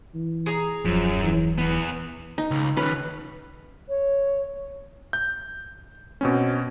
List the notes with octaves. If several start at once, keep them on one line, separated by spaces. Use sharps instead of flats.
E3
G#4 A#5
D#1 F#2 F3
E3
E2 E3 B3
D#4
C#2
D#3 C#4 B4
C#5
G6
B2 C4 C#4